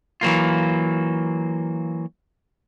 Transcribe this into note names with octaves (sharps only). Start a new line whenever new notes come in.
E3 F#3 A#3 F4